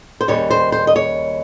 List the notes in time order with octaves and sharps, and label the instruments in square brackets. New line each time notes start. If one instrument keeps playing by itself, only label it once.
[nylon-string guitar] C5
D#2 C#3 G3 C#5
C5
C5
D#5
C#5